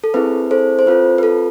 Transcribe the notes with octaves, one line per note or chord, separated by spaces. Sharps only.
A4
C4 E4 G#4 B4
A4 C5
C5
C4 F4 A4 B4
B4
A4